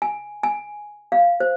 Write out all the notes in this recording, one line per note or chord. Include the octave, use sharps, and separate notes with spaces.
G#5
G#5
F5
C5